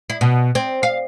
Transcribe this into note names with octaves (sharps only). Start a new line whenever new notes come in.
E4
B2
C4
F5